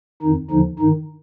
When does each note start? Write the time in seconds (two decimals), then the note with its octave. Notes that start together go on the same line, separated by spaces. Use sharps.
0.22 F2 D#3 D#4
0.50 D#2 D3 F3 D#4
0.79 G2 D#3 D#4